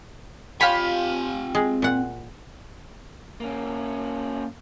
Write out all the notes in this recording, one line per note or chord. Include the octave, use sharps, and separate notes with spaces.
C4 F4 G4 C#5 G#5 B5
G#3
A#2 F#5
A#3 C#4